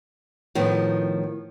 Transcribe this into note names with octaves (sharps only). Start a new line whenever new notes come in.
A2 D#3 F3 B3